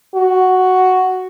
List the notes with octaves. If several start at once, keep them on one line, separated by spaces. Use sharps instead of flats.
F#4